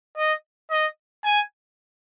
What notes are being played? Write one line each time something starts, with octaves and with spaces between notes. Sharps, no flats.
D#5
D#5
G#5